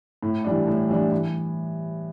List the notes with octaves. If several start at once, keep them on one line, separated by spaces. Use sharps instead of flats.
A2
E3 G3 D4
A2
E3 G3 D4
E3